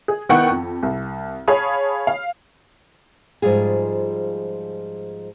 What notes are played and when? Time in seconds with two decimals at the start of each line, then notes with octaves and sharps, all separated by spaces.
0.08 G#4
0.29 D#3 B3 E4 F#5 G5 C#6
0.50 F2
0.83 C2
1.48 G#4 C#5 F5 A5 B5 D#6
2.07 F5
3.42 G#2 F3 G3 F4 G#4